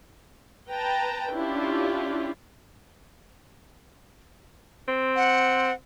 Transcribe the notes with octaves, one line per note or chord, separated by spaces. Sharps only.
B4 G5 A5 A#5
C#4 D4 E4 F4 G4
C4
F#5